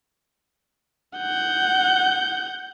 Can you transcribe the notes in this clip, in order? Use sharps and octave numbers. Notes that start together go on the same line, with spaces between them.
F#5 G6